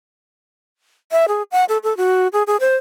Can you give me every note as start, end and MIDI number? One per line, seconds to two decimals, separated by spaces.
1.12 1.26 76
1.28 1.42 68
1.52 1.65 78
1.69 1.78 69
1.83 1.96 69
1.97 2.28 66
2.33 2.43 68
2.47 2.56 68
2.60 2.76 72